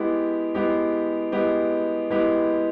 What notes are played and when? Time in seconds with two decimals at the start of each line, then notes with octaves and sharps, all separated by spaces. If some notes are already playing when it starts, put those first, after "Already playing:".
Already playing: G#3 B3 E4 G4
0.55 G#3 B3 E4 G4
1.32 G#3 B3 E4 G4
2.10 G#3 B3 E4 G4